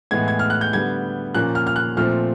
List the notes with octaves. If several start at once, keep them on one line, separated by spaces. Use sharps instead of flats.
A2 E3 G#3 B3 G#6
G#6
F6
F#6
G6
D3 G3 B3 G#6
A#2 F3 A#3 C#4 F#6
F6
F6
F#6
A#2 F3 A3 C4 F6